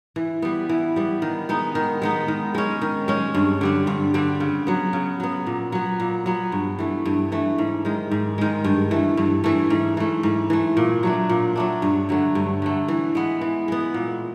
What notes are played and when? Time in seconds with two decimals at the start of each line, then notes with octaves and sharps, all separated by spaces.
0.16 E3
0.42 G3 B3
0.69 E3
0.96 G3 B3
1.22 D#3
1.49 G#3 B3 D#4
1.75 D#3
2.02 G#3 B3 D#4
2.28 D#3
2.54 G#3 C#4
2.81 D#3
3.08 G#3 C#4
3.34 G2
3.61 D3 G3 C4
3.87 G2
4.14 D3 G3 C4
4.40 C#3
4.67 F#3 B3
4.93 C#3
5.20 F#3 B3
5.46 A#2
5.72 F#3 B3
6.00 A#2
6.26 F#3 B3
6.52 G2
6.79 E3 A3
7.05 G2
7.32 E3 A3
7.58 G#2
7.85 D#3 G#3
8.11 G#2
8.38 D#3 G#3
8.64 G2
8.91 E3 A3
9.17 G2
9.44 E3 A3
9.70 G#2
9.97 E3 A3
10.23 G#2
10.50 E3 A3
10.77 A#2
11.03 F#3 A3 D4
11.29 A#2
11.56 F#3 A3 D4
11.82 G2
12.09 D3 F#3 A3
12.35 G2
12.62 D3 F#3 A3
12.88 E3
13.15 G#3 B3
13.41 E3
13.68 G#3 B3
13.94 A#2